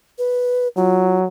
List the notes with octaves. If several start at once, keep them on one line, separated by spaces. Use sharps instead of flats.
B4
F#3 F4